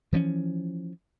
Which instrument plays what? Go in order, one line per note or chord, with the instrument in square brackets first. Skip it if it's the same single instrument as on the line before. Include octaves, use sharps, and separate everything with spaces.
[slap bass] E3 F3 A3 C#4